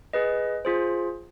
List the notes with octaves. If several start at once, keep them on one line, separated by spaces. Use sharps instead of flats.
G#4 B4 D#5
F4 G#4 C5